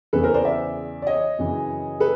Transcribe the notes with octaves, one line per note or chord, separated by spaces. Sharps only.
E2 C#3 E3 A4 B4
A#4 C5
C5 D5
D5 E5
D5
C#5 D#5
F#2 C#3 E3
A4 B4